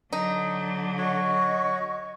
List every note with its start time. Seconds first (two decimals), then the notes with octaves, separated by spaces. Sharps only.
0.13 D3 F#3 D#4
0.98 F#4 C#5 D#5 C#6